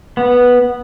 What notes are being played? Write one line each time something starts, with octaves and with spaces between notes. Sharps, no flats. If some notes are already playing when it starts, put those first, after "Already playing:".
B3